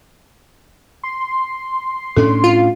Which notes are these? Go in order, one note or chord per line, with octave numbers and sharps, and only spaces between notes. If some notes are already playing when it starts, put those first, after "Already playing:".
C6
A2 C#4 D4 A4
F4